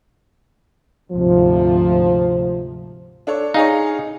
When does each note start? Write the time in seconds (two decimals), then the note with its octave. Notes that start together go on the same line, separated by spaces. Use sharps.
1.11 D2 G#2 C3 F3
3.27 D4 A4 C#5
3.54 D#4 G#4 C#5 F5